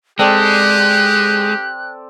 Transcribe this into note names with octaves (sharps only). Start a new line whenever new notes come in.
G#3 C4 G4 A4 D5 F#6